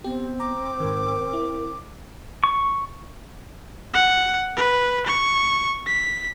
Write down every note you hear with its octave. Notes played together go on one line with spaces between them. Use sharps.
B3 C4 G4
A#5 D6
G#2 D#3 A#4
E4
C#6
F#5
B4
C#6
B6